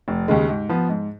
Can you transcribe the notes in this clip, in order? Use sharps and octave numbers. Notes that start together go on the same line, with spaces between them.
F1
D#2 C#3 G#3
G#2
F3 B3
G#2